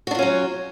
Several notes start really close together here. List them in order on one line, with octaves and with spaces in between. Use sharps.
F#4 D4 F4 C#4 F#3